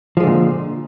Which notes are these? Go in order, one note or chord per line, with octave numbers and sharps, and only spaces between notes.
A#2 D3 F3 G#3